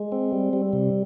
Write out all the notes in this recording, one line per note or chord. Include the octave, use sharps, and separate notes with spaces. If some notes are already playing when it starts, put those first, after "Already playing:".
Already playing: G#3
C4
G3
G3
C3